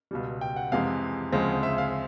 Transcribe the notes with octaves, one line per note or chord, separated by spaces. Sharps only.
C#2 B2 G3
G5
F#5
F2 C3 E3 G#3 F5
D2 C#3 F3 G#3 C4
E5
F5